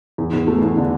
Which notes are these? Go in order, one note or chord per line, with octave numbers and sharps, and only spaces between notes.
E2
E2
A3
E2
D3